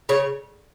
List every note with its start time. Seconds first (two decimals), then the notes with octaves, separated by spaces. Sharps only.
0.09 C#3 C#5